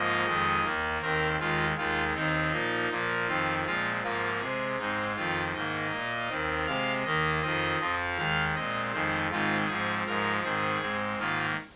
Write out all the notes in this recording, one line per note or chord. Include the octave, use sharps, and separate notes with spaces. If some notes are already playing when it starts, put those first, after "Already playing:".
Already playing: G#2 F3 A#3 D#5
F2 D#3 G#3
D#2 D#3 A#3
D#2 D#3 C4 A#4
D#2 D#3 G#3 F4
D#2 D#3 G#3 F4
D#2 D#3 C4 D#4
A#2 F3 A#3
A#2 F3 A#3
F2 D#3 C4 F4
A#2 F3 G#3 C4 F4
G#2 F3 A#3 F4
C3 G#3 C4 G#4
G#2 G#3 C4 D#4
F2 D#3 C4 F4
G#2 D#3 A#3 D#5
A#2 A#3
D#2 D#3 C4
C3 G#3 C4 F5
D#2 D#3 A#3 D#5
F2 D#3 C4 D#5
F2 F3 C4
D#2 D#3 G#3 F5
A#2 G#3 C4 D#5
F2 D#3 G#3 C5
G#2 D#3 G#3 C4 F4
G#2 F3 C4 G#4
G#2 F3 G#3 A#4
G#2 D#3 C4 G#4
G#2 G#3 C4
G#2 D#3 A#3 F4